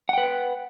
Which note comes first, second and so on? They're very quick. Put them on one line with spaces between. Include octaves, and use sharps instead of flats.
F#5 G5 B4